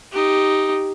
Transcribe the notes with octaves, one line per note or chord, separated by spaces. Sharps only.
D#4 G4